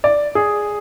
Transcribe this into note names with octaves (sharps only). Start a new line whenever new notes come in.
D5
G#4